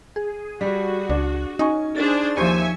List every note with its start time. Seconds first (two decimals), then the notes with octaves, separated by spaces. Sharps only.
0.16 G#4
0.61 G3 F#4
1.09 C#2 D4
1.59 C#4 D#4 D#5 G#5 C#6
1.96 D4 G#4 C5 A6
2.37 D#2 F3 C5 E5 G#5 C#6 C#7